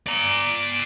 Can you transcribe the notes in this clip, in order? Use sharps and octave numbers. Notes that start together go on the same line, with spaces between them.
D5 A#5